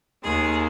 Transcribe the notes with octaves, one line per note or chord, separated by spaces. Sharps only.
D#2 D#3 G#3 G#4